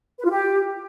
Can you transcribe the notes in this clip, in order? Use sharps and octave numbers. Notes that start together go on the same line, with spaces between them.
B4
F4
G4